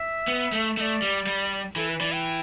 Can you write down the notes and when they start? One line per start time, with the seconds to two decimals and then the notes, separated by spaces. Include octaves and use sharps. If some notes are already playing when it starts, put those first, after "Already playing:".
Already playing: E5
0.28 B3
0.52 A3
0.77 A3 D5 E5
1.02 G3
1.27 G3
1.76 E3 A4
1.89 B4
2.00 E3 D5
2.14 G5